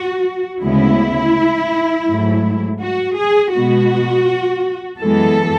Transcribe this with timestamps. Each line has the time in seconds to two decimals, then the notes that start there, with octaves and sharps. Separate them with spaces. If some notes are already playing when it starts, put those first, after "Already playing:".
Already playing: F#4
0.62 D2 C#3 G#3 B3 E4
2.08 G#2 F#3 A3
2.82 F#4
3.18 G#4
3.54 B2 G#3 B3 F#4
5.00 F#2 E3 G#3 B3 A4